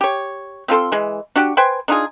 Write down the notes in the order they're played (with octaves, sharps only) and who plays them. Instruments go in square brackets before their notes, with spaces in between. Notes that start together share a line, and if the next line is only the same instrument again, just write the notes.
[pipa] G4 C#5
C4 F4 A4 C6
E3 G#3
D4 F#4 G4
B4 C5 G5 G#5
D4 D#4 F4 G#4